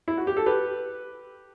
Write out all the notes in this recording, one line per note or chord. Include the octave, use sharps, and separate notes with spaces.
E4
F#4
G4
A4
G4 B4